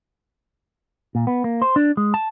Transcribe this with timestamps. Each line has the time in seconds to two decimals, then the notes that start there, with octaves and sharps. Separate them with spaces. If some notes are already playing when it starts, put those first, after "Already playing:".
1.15 A#2
1.27 B3
1.44 A#3
1.62 C5
1.76 D4
1.97 G#3
2.14 A5